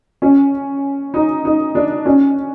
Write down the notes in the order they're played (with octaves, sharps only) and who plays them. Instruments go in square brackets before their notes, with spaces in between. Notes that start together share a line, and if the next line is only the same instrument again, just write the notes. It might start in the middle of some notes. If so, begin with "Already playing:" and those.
[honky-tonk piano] C#4
D#4
D#4
D4
C#4